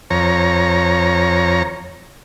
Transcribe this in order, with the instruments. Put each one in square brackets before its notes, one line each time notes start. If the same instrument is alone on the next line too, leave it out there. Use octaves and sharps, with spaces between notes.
[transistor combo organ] F2 C#5 A#5